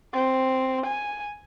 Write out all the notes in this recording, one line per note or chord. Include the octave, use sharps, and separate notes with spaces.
C4
G#5